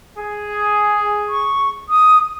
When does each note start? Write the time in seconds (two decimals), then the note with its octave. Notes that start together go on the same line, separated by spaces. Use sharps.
0.17 G#4
1.29 C#6
1.89 D#6